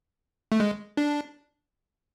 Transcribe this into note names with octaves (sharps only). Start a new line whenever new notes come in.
A3
G#3
D4